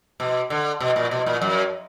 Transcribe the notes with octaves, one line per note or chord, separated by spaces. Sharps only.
B2
D3
B2
A#2
B2
A#2
F#2